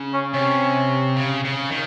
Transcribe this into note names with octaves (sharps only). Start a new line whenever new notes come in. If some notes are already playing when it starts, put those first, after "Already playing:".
Already playing: C#3
C#4
C3 C#4
C#3
C#3
D#3